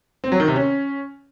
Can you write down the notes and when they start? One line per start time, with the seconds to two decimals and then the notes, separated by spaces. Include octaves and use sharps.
0.24 C4
0.32 F#3
0.40 D#3
0.48 C3
0.56 C#4